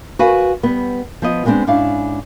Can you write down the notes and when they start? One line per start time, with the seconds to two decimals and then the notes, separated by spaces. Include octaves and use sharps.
0.19 F#4 A#4 B4 F5 G#5
0.63 G3 B3
1.22 F3 B3 D#5
1.45 G3 G#3 B3 C4 D4
1.67 G#2 C#4 D4 E4 F5